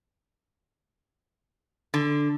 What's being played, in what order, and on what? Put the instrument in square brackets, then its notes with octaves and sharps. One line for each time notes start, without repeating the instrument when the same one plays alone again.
[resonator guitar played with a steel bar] D3